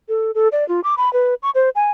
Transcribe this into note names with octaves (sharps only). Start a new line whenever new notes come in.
A4
A4
D5
F4
D6
B5
B4
C#6
C5
G#5